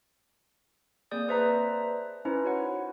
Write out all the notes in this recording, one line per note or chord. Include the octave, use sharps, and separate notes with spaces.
A#3 C4 G#4 D5 D#6 G6
B4 C5 D5 E5 A5 A#5
C#4 D#4 E4 B4 C5
F#4 C#5 F#5